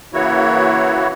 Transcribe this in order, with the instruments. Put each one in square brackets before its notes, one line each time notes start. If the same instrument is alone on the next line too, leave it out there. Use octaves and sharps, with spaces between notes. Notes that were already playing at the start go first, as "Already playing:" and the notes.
[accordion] C#3 E3 A#3 E4 F#4 C#5